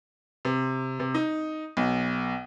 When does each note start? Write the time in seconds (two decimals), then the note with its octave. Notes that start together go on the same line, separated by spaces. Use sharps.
0.45 C3
0.99 C3
1.14 D#4
1.77 B1